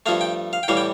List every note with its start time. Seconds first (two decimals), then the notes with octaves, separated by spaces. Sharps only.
0.06 G2 F3 A3 F5
0.21 G5
0.53 F5
0.63 G5
0.68 A2 E3 G3 F5
0.77 G5